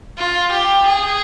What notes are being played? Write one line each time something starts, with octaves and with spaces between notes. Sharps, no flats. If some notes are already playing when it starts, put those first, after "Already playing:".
F4
G4
G#4